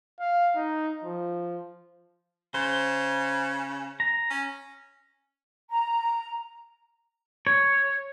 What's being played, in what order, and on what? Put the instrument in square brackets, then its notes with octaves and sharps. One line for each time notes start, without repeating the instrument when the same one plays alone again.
[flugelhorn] F5
D#4
F3
[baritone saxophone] C#3 [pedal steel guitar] C5
[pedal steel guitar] A#5
[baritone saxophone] C#4
[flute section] A#5
[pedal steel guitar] C#5